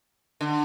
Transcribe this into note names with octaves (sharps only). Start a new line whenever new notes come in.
D3